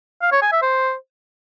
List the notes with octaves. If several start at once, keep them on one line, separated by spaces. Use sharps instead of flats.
F5
C#5
G#5
E5
C5